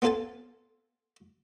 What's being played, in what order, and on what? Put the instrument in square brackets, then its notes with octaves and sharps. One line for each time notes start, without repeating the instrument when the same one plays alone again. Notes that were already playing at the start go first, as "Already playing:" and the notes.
[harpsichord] B3 C4 F4 A4 G#5 A5